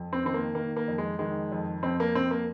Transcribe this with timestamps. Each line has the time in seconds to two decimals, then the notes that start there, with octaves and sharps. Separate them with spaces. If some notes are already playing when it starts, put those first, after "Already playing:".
Already playing: F2
0.13 C4
0.24 D#3 C4
0.34 A#3
0.55 D#3 A#3
0.76 A#3
0.88 F2
0.98 G#3
1.19 D#3 G#3
1.52 F2
1.83 F2 C4
2.00 A#3
2.15 F2 C4
2.31 A#3